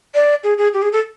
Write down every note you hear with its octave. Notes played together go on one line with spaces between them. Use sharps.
D5
G#4
G#4
G4
G#4
A4